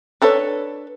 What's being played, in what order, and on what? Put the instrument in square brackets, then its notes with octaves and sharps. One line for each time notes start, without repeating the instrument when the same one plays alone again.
[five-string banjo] D4 A4 B4 C#5